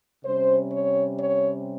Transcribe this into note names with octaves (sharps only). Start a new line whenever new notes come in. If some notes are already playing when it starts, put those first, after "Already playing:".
C3 G3 C#4 C5
C#5
C#5